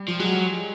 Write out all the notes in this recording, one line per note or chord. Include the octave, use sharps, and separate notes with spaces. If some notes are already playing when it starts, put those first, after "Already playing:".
Already playing: G3
F3
F#3 G#3